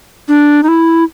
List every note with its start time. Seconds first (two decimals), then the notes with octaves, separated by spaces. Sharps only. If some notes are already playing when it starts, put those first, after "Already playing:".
0.28 D4
0.63 D#4
0.68 E4